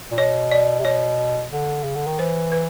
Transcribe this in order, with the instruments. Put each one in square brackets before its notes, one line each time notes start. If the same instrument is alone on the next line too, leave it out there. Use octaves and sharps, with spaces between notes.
[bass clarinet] A#2
[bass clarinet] B2 [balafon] C#5
[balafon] D5
[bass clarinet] C3
[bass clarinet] B2 [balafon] C#5
[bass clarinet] D3
C#3
D3
D#3
[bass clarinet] E3 [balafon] C5
[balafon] B4